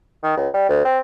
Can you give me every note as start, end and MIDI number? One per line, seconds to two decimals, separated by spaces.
0.23 0.34 51
0.37 0.48 37
0.54 0.68 55
0.69 0.80 38
0.85 0.99 60